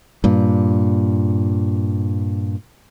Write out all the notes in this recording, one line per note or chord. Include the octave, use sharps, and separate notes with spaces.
G2 A#2